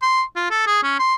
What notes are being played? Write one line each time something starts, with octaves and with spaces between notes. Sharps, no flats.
C6
F4
A4
G#4
C#4
C6